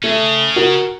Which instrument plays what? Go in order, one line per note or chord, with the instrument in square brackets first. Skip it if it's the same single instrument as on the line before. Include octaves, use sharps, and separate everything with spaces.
[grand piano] A3 [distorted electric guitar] C#4 G#4
[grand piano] F#4 A#4